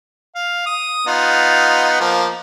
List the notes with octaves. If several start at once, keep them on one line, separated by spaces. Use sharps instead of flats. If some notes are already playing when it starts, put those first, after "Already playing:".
F5
D#6
B3 D#4 F4
F3 A#3